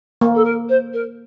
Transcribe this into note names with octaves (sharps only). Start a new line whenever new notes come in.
A#3
A4
A#4
C5
A#4